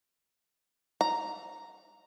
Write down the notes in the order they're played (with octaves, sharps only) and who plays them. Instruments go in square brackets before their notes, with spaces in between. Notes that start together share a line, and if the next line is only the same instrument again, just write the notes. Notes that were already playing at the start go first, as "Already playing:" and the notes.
[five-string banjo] A#5